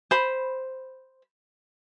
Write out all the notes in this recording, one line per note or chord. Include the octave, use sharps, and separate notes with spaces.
C5 B5